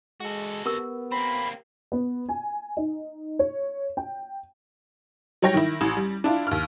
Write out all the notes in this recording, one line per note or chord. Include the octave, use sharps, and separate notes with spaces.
G#3 F#4 A4
B3 G4 A#4 E6
A#3 C4 B5
B3
G#5
D#4
C#5
G5
F#3 G3 C#5 G5 A#6
D#3 E4
A1
G3
D4 E4 F4
D#2 F6